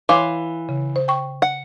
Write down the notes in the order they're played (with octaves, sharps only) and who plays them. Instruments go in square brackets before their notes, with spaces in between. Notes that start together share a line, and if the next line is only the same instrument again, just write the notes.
[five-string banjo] E3 F5 [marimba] C#5 C6 D6
[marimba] C#3
C5
G5 C#6
[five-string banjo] F#5